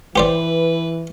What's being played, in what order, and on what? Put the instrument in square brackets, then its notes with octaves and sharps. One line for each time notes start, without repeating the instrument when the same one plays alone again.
[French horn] E3 [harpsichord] G4 C5 D5 [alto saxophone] B4